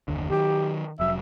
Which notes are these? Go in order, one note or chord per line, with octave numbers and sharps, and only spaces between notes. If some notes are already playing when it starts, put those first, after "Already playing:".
F#1 D#2 D3
D#3 F#3 G4
F1 F#3 E5